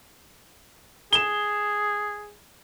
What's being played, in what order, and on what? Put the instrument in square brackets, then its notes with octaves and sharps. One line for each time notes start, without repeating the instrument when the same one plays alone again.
[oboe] G#4 [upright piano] E7 G7